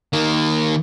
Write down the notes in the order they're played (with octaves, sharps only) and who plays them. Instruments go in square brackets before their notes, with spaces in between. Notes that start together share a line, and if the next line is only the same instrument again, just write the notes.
[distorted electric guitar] D#3 A#3